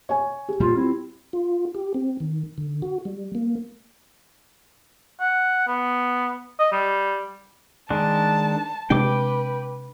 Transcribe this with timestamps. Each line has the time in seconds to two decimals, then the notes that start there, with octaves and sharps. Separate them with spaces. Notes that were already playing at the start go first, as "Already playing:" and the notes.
0.09 C#5 G#5
0.48 G4
0.60 A#2 G3 F4
0.76 C4 E4
1.33 F4
1.75 G4
1.94 C4
2.20 D#3
2.58 D3
2.82 F#4
3.05 G3
3.35 A#3
5.20 F#5
5.67 B3
6.59 D#5
6.72 G3
7.90 D#3 G#3 D4 A5
8.90 C3 G#3 D4 B4 G5 D6